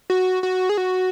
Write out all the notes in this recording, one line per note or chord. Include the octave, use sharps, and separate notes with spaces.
F#4
F#4
G#4
F#4